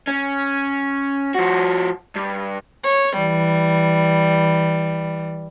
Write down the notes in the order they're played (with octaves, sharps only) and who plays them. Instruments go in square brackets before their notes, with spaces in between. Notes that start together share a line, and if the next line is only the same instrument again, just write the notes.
[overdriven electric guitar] C#4
F3 F#4
G2
[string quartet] C#5
E3 G3